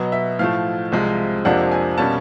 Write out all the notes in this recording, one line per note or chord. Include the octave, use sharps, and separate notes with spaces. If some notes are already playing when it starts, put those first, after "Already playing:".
Already playing: B2 F#3 B3 D#5
E5
A2 F3 A3 F5
C2 C3 F3 G#3
F2 C3 F3 A#3 D4 F#5
G#5
B2 G3 A#3 C#4 A5